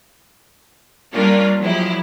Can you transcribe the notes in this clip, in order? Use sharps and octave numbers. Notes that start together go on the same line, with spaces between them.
G3 A#3 C#4 D4 F4 A#4
F3 F#3 G#3 E4 G4